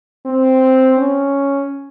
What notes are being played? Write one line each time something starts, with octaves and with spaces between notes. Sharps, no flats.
C4
C#4